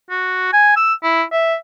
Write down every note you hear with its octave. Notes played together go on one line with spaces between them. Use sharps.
F#4
G#5
E6
E4
E5